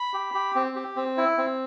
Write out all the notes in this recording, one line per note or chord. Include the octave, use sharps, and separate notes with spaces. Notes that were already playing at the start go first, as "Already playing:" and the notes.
Already playing: B5
G4
G4
C4
G4
C4
E4
C4